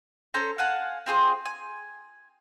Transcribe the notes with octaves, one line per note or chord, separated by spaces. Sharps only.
C#4 A4 C5 A#5
F5 F#5 G#5 A5
C4 F4 G#4 C5
G#5